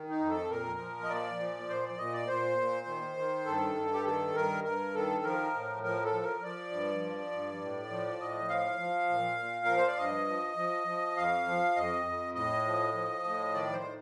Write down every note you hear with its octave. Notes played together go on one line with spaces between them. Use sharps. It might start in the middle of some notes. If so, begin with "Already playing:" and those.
Already playing: D#3
D#4
F2
A4
A#2 A#4
F3
D#5
A#2 D5
F3
A#2 C5
D5
A#2 D#5
D5
A#2 C5
A#2
D#3
D#3
G2 A4
G2
G4
D#3 A4
G2 A#4
G2 A#4
D#3 A4
F3 A#4
A2
F3 A#4
A4
F3
A#4
F3 D5
G2
F3
G2
A2
F3
A2 D#5
F3 F5
F3
A#2
A#2
F3 A#4
C5
D5
G2 D#5
F3
F3
F3
F2 F5
F3
F2 D#5
F2
A2 D#5
F3
F3
A2
D#3 D5
C5
D#3